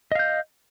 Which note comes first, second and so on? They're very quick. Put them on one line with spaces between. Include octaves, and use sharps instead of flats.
D#5 F5 G6